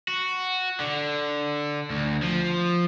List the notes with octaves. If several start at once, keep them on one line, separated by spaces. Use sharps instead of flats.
F#4
D3
D2
F3